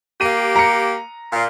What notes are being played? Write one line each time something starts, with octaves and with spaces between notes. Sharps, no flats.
A#3 G4 D#7
A#5 C#7
A#2 F5